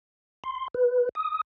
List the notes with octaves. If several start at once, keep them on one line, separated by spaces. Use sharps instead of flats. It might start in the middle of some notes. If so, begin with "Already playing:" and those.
C6
B4
D#6